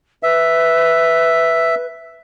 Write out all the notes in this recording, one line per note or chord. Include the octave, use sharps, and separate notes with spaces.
B4 E5